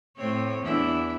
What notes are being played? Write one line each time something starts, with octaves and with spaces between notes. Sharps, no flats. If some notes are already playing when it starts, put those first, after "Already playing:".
A2 C4 C#5
E2 D4 E4